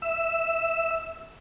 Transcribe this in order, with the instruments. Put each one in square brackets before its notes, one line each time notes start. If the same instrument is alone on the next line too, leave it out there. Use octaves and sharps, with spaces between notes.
[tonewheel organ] E5